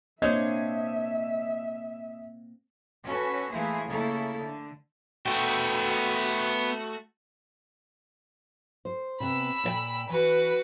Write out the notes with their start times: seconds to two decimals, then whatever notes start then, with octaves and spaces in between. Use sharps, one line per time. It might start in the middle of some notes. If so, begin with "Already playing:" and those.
0.22 A#3 C4 D4 C5 C#5 D#5 E5 G#6
3.05 C#4 F#4 A4 B4
3.50 E3 A3 A#3 E4 G#4 C5
3.87 C#3 A3 A#3 E4 A4
4.38 D3
5.26 A3 B3 F#4 G5
8.85 C5
9.20 C3 B3 B5 E6
9.64 A#2 B4 G5
10.09 E3 F#4 B4